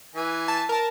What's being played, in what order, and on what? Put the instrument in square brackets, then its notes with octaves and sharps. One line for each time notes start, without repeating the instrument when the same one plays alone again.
[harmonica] E3 B4 G#5
[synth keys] A5
A#4 A5